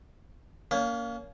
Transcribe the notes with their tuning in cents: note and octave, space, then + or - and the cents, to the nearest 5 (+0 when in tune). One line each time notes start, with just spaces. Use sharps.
A#3 +0 C#4 +40